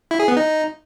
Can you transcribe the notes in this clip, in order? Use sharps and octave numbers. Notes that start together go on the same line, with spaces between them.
E4
G#4
B3
D#4